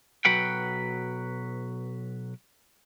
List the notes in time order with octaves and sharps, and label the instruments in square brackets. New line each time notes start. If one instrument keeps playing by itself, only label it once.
[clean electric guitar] B1 F#3 B4 F#5 G5